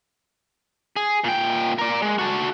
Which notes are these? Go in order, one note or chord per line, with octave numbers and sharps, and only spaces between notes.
G#4
A#2 G5
A#4 D5
G#3
F#4 A4